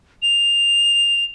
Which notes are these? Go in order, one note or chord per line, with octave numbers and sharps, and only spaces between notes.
F7